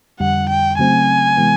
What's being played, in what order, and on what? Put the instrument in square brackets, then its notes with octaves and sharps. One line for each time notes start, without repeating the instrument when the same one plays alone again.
[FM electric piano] F2 D3 G3 [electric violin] F#5
[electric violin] G5
[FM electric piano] C#3 F#3 A3 C4 [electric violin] G#5
[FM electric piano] C3 E3 G#3 B3